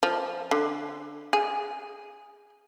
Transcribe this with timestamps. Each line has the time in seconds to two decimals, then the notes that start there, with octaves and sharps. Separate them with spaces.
0.03 F3
0.51 D3
1.33 G#4